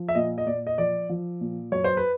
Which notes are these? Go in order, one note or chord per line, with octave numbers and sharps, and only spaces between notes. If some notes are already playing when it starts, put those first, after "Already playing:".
Already playing: F3
E5
A#2 D#5
D#5
A#2 D5
D#5
F3 D5
F3
A#2
F#2 C#5
C5
B4